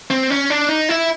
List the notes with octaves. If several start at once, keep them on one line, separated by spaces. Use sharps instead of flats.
C4
C#4
D4
D#4
E4